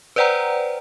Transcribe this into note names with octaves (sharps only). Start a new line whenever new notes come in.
B4 C5 D5 F#5 G5 A#5